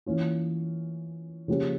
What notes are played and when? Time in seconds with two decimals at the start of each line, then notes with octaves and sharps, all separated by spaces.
0.06 E3 A#3 C#4 F4
1.48 C#3 F3 A#3 C#4 G4